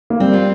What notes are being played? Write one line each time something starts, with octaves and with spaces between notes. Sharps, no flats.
A#3
G3 C4
F4